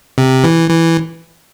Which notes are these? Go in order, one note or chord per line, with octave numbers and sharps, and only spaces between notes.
C3
E3
E3